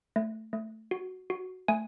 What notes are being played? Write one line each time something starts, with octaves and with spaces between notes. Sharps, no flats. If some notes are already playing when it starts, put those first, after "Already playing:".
A3
A3
F#4
F#4
A3 G#5